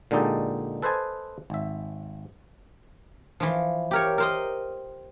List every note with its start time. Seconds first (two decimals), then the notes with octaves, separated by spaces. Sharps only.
0.11 A#2 D3 G#3 D#4 G4 A4
0.82 A4 B4 C5 D#5 G#5 A5
1.50 G#1 E5
3.40 E3 F3
3.91 G4 A#4 C#5
4.18 A#4 C5 D#5